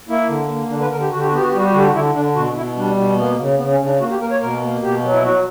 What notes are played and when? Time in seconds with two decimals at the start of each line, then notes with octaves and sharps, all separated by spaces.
0.08 A#3 E4
0.29 D3
0.49 A#3
0.70 D3 D4
0.81 B4
0.91 D3 A#4
1.01 G4
1.11 D3 F#4
1.19 G4
1.26 F#4
1.31 B3 G4
1.41 F#4
1.49 G4
1.53 G3 F#4
1.64 G4
1.71 D3 F#4
1.78 G4
1.86 F#4
1.94 D3 E4
2.14 D3 D4
2.35 B2 F#4
2.55 B2 E4
2.76 G3 D4
2.96 B2
3.18 A#3 B3
3.39 C#3
3.58 C#3 B3
3.72 C#4
3.80 C#3
3.86 D4
4.00 A#3 F#4
4.10 G4
4.20 A#3 A#4
4.31 C#5
4.41 B2 A#4
4.62 A#3
4.83 B2 G4
5.03 F#3
5.13 E4
5.23 F#3 F#4